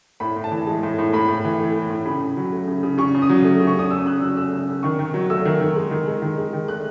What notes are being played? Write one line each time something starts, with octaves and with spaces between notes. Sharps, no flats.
A2 B5
A2
A5
E3
G#3
A2
A2
A2 B5
A2
E3
A3
A2
A2
C#3 B5
C#3
F#3
A3
C#3
C#3
C#3 C#6
C#3
D#6
F#3
A3
C#3
C#6
C#3 D#6
C#3 E6
C#3 F#6
F#3 E6
A3 E6
C#3
C#3
D#3 C#6
D#3
F#3
A3 E6
D#3
D#3
G#3
D#3
G#3
D#3
G#3
D#3
A3 F#6